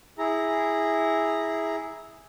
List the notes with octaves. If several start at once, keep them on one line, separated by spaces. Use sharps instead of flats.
E4 G#4 A#5